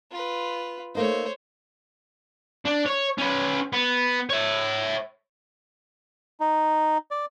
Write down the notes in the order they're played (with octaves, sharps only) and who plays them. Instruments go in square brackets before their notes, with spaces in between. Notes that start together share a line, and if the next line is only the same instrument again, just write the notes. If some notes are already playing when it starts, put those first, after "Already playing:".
[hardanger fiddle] F4 B4
[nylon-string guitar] A3 A#3 D#4 [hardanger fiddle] C5 C#5
[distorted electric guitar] D4
C#5
C#4 B4
B3
C#5 E5
[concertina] D#4
D5